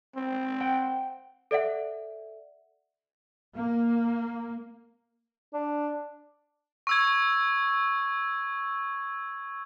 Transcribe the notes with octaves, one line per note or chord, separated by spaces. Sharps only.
C4
F#5 G5
A4 D5 E5 F#5
A#3
D4
C#6 E6 G#6